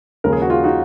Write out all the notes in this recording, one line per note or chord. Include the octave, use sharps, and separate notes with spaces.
D#2 C#3 F3 G#3 A#4
G#4
F#4
F4 G#4
D#4 F#4